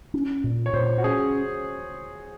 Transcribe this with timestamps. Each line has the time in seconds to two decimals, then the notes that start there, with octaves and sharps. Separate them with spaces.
0.14 C#4
0.44 A#2
0.66 C#5
0.73 A#2 C5
0.98 F#4
1.04 C#4 G#4